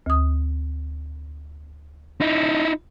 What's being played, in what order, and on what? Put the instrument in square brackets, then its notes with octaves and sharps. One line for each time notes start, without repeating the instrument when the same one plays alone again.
[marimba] D2 D#6
[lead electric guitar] D#4 E4